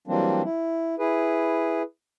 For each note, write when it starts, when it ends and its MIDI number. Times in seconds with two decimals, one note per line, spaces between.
0.07 0.42 52
0.07 0.42 54
0.07 0.42 55
0.07 0.42 58
0.07 0.42 60
0.07 0.42 62
0.44 0.95 64
0.99 1.82 64
0.99 1.82 68
0.99 1.82 71